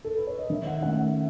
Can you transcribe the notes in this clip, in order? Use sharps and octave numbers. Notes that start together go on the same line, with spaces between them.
A4
B4
C#5
D#5
D#3 E5
F#5
A3 C#4 F#5
E5